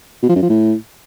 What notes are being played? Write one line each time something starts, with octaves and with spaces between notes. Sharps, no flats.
B2
F3
F#2
F3
A2